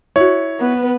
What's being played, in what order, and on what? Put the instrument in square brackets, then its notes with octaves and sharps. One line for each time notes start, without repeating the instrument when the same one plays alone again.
[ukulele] E4 F#4 [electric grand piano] C#5
[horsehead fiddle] B3 B4